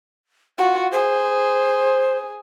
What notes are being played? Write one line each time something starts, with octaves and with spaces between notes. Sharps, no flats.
F4 F#4 F#5
G#4 C5